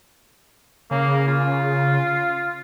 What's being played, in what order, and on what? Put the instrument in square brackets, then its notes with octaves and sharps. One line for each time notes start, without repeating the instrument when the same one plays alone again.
[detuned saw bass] C#3 [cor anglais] A#3
[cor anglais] F4